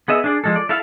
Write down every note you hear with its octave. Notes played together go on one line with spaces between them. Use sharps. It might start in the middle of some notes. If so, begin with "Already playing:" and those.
B3 G#4 D#5 E5
D4 G#4 D5
F3 G#3 A4
D5
E4 A4 E5 F5